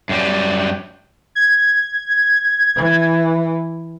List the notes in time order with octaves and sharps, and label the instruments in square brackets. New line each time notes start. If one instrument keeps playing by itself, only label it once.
[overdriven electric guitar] F#2 G3
[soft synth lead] G#6
[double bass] E3